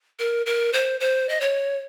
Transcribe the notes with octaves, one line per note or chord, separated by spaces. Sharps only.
A#4
A#4
C5
C5
D#5
C#5